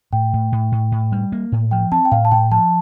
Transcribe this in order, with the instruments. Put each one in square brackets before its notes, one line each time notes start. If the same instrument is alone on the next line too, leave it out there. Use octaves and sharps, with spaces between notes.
[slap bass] A2 [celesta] G5
[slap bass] A2
A2
A2
A2
G3
A#3
A2
[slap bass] F3 [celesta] G5
[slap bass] C4 [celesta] A5
[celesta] G5
[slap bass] A2 [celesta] F5
[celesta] A5
[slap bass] A2 [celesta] G5
[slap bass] F3 [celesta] A5